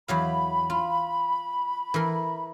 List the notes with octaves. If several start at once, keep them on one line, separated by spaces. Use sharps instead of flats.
E2 F#3 F5 B5
F4
E3 A#4